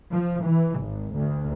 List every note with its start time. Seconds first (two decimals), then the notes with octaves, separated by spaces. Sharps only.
0.12 F3
0.43 E3
0.80 G#1
1.15 D2